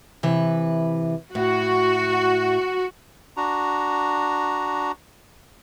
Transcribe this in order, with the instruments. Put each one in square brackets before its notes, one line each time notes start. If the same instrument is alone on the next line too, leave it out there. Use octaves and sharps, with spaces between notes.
[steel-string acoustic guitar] C3 E3 B4
[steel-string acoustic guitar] A2 [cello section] F#4
[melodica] D4 F#4 A#5